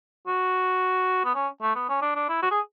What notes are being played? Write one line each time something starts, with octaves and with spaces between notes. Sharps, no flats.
F#4
B3
C#4
A3
B3
C#4
D4
D4
E4
F#4
G#4